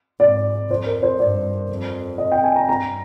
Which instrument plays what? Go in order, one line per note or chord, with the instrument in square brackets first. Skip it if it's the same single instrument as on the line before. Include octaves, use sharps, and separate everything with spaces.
[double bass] G#2 [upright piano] D5
[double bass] F2 [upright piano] C5
[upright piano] A#4
C5
[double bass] G2 [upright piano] D5
[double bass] F2
[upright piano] D#5
G5
G#5
A#5
[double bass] G2 [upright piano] A#5